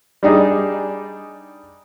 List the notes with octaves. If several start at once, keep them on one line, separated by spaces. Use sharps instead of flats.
G3 D4 D#4 G#4